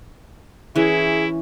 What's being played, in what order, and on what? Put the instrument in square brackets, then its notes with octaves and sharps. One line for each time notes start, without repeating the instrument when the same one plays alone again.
[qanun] E3 C#4 [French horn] E4 [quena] G#4